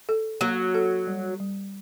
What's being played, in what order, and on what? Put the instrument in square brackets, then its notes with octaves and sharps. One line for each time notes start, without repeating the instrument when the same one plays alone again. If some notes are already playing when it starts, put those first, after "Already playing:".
[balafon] A4
[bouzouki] F#3 [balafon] A#3
[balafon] A4
G3
G3